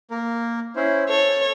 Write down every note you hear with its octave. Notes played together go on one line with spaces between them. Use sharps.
A#3 A#4
C#4 E4 C5
A4 C#5